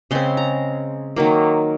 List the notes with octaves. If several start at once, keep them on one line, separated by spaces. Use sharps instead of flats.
C#3 G#3 C4 C6
A#5
D#3 F#3 A#3